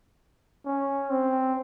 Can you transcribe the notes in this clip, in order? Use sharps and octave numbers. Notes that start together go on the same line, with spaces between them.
C#4
C4